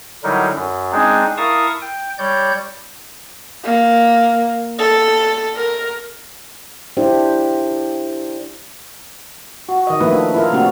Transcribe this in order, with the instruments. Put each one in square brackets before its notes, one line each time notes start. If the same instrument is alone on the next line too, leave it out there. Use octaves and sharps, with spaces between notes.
[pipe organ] D3 F#3 G3 D#4 E4 A#4
F#2
G#3 C4 D4 D#4 G#4
E4 A#4 F5 A5 C#6 D#6
G5
G3 C#5 D5 G6
[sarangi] A#3
A4
A#4
[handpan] D4 E4 G4 C5
F#4
D#3 D#5
D#3 F3 A3 A#3 E4 B4
D4
E4 F4 A#4
C3 A3 A#3 C4 D4 F#4